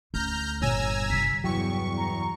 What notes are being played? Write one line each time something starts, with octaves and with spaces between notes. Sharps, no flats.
D2 C#4 A#5 F6 G6
G1 A#2 C#5 G#5 A#5 E6
G2 C3 B6
E2 F#3 G5 C#6
A#5